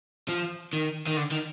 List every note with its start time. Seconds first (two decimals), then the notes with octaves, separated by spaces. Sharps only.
0.29 F3
0.73 D#3
1.07 D#3
1.17 D3
1.32 D#3